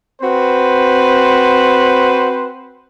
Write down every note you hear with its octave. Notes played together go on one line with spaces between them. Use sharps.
C4 F#4 B4 C5